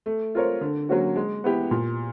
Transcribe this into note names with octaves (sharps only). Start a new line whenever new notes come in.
A3
C4 F4 A#4 C#5
D3
F#3 A#3 C#4 F#4
G#3
B3 E4 G4
A#2